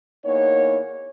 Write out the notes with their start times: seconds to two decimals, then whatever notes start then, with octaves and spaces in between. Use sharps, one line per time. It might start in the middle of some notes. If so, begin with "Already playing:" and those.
0.25 E2 A#3 D#4 C#5